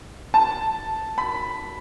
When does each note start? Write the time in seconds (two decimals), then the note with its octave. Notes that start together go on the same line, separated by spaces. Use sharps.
0.34 A5
1.18 B5